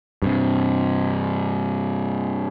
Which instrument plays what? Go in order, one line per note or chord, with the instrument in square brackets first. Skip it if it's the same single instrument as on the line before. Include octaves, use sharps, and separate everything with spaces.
[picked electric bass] G2 C3